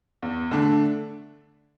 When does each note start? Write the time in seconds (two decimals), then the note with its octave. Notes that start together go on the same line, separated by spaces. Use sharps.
0.22 E2
0.51 D3 A3 D4